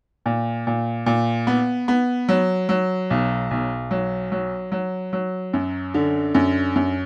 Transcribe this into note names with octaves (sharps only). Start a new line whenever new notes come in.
A#2
A#2
A#2
B3
B3
F#3
F#3
B1
B1
F#3
F#3
F#3
F#3
F#2
D3
F#2
F#2